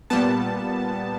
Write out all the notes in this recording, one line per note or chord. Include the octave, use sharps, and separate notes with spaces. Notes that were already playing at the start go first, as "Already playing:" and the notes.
A#2 G3 B3 A5